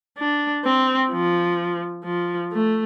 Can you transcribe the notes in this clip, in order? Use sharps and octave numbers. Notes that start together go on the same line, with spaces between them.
D4
C4
F3
F3
A3